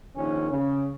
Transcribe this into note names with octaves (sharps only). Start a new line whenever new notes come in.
A#1 D#3 C#4
C#3